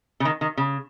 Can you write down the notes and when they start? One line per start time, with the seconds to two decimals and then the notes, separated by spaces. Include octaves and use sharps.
0.20 C#3
0.25 D#3
0.41 D#3
0.57 C#3